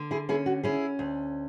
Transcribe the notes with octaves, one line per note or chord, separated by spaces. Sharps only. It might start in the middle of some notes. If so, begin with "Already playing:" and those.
Already playing: D3
E4 G#4
C#4 E4 G#4
F#4
C#4 E4 G#4
D2